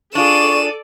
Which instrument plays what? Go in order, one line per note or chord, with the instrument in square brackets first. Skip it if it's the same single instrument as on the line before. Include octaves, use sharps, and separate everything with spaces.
[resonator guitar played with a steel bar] D4 F4 G#4 [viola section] A4 D5 [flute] C#6 [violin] D#7 E7